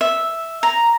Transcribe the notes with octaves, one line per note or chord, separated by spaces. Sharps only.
E5
A#5